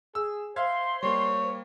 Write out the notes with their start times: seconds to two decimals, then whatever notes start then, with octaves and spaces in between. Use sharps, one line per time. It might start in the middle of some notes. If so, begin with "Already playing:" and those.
0.15 G#4 E6
0.56 C5 E5 F5 C6 G#6
1.03 G3 A#3 C#5